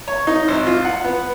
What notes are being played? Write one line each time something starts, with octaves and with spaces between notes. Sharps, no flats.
C#5
D#4
G#1
F4
F#5
B3